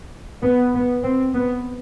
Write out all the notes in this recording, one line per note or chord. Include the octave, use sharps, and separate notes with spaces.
B3
B3
C4
B3